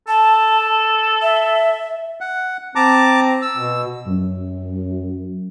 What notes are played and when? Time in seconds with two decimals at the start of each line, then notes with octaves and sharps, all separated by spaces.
0.08 A4 A5
1.22 E5
2.21 F#5
2.75 C4 A5 A#5 D6
3.42 E6
3.57 B2
4.07 F#2